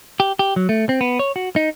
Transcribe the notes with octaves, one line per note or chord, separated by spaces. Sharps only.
G4
G4
F#3
A3
C4
B3
C#5
F#4
D#4